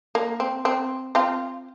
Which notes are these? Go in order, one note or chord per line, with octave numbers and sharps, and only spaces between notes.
A#3
C4
C4
C4 F4